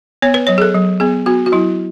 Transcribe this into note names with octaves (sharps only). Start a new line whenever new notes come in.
B3 C#5
B4
F#3 C#5
G#4
A4
F#3
B3 G#4
B3 F#4
F#4
F#3 E4